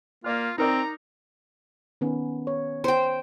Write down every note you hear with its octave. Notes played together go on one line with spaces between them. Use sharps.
A#3 F4 D5 F6
C4 D#4 A#4 D5 A#5
D#3 B3 C#4
C#5
C5 G5